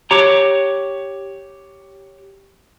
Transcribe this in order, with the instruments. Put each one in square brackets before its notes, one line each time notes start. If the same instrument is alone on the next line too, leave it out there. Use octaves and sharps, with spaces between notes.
[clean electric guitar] G4 C#5 A#5